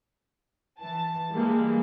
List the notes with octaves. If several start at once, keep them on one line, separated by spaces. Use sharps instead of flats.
E3 A5
E3 G3 G#3 A#3